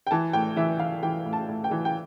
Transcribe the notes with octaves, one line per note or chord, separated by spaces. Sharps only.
G5
E3 A5
A2 G5
E3 E5
E3 F5
E3 G5
A2
A5
A2
G5
E3
G5